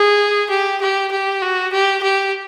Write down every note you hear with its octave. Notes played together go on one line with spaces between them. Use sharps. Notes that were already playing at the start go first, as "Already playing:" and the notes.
Already playing: G#4
G4
G4
G4
F#4
G4
G4